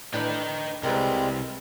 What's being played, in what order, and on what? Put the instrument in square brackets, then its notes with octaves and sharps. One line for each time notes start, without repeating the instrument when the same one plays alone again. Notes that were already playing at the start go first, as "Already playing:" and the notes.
[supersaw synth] A2 D4 B4 [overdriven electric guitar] D#4 G5
[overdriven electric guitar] C2 [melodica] G3 G#3 C4 [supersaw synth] A#4 B4